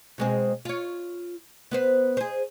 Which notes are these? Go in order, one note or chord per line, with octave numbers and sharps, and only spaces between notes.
B2 G#3 C4
F4 C#5
B3 B4 C5
G#4 C5